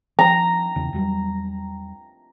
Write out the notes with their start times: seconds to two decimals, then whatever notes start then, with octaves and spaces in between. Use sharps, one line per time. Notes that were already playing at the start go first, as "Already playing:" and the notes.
0.19 F3 A#5
0.76 E2 C#3 E3
0.93 E2 F#3 G3